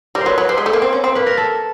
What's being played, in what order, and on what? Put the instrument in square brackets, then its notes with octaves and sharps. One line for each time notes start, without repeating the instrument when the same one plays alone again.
[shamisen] G3 [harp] A#4
[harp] C5
[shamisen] F#3 [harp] B4
[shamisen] F#3 [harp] B4
[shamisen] G3 [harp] C5
[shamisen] G#3
A3
A#3
C4
C#4
C4
[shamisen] A#3 [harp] B4
[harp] A#4
A4